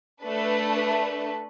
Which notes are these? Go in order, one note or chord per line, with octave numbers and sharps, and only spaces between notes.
A3 D4 B4